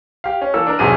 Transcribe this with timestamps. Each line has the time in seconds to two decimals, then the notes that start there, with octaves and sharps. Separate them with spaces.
0.24 G4 F5
0.42 C#4
0.54 E3 A#3 A4 E6
0.67 D4 A#4
0.79 B1 E2 C3 F#3 G#4 D#7